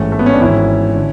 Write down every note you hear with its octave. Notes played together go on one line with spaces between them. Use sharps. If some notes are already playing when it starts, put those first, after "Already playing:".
Already playing: A1 G#2 E3 A3 C#4
A3
B3
C#4
D4
G#1 G#2 E3 C#4 E4
D3